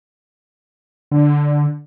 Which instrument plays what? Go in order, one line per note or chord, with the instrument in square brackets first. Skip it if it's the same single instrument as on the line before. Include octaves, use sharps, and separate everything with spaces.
[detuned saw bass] D3